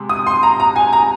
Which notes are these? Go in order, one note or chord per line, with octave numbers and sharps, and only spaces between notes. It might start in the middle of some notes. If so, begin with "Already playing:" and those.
Already playing: C3 G#3
D#6
C6
A#5
A#5
G#5
A#5